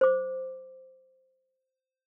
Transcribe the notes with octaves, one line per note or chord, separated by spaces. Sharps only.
C5 D6